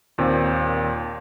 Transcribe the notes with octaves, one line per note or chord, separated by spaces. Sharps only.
D#2 A#2 C4